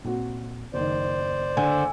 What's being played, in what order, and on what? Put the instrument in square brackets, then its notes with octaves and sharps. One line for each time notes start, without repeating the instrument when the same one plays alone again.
[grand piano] A#2 C4 F#4
[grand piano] F#1 D#3 [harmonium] C5 D5
[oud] D3 [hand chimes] G#5